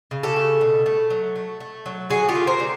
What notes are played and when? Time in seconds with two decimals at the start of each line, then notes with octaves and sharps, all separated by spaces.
0.11 C#3
0.23 G4 A4
0.36 A3
0.61 B2
0.86 A3
1.10 F#3
1.36 A3
1.60 A3
1.86 F#3
2.10 D3 F#4 G#4
2.29 F4 G4
2.35 A3
2.47 A#4 C5
2.60 D3